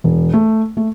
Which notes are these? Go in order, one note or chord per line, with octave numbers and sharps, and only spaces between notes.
E1
A3
A3